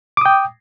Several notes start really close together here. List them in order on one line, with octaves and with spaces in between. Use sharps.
D6 D#6 G5